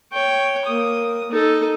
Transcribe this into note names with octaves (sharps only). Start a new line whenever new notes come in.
C#5 G5
A#3 D#6
D#4 A4